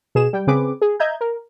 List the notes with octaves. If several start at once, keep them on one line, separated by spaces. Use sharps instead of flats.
B2 G#4 E7
G3 G5
C#3 C4 G#4 B4 D6
G#4
D#5 E5 A#5 G6 G#6
A#4